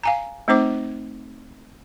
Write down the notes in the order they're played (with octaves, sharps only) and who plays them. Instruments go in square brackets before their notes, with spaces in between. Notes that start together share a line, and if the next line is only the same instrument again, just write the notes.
[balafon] F5 G#5 A#5
A3 C4 D#4 C5 D6